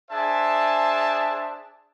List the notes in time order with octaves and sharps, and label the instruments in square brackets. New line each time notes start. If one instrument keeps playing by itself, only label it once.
[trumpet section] D4 G#4 C5 E5 G#5 A5